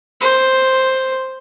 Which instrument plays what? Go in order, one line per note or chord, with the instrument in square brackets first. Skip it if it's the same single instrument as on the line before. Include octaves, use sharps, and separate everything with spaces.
[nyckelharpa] C5